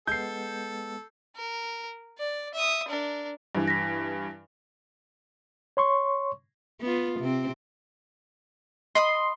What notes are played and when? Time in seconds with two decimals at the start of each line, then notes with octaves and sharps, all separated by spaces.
0.07 G#3 B3 A4 G6 C7
1.36 A#4
2.19 D5
2.54 E5 D#6
2.88 D4 A#4
3.55 G2 E3
3.68 A#6 B6
5.77 C#5 C6 C#6
6.81 B3 F4
7.20 C3 C4
8.95 D#5 B5 C6 D#6